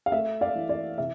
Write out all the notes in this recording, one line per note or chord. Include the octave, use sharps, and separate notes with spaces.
F5
A3 E5
D5 F5
E3
D5
C3 E5